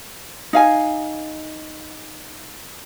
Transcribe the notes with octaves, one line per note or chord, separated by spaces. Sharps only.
D#4 F5 G#5